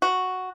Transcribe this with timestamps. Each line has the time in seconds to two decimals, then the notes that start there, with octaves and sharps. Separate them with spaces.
0.02 F#4